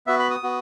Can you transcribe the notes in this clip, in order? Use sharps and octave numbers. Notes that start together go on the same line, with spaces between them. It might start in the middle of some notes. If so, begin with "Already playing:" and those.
B3 F#4 E5
B5
D#6
B3 F#4